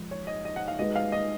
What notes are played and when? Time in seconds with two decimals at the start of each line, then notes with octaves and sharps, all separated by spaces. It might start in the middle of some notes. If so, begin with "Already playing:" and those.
Already playing: F3 G#3
0.11 C#5
0.27 D#5
0.45 D#5
0.56 F#5
0.68 F5
0.78 G#3 D#4 F#4 B4 D#5
0.95 F5
1.12 D#5